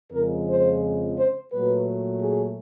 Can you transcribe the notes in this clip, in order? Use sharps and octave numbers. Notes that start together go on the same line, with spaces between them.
F2 C#3 F3 G#3 A#4
C5
C5
A#2 F#3 A3 B4
G#4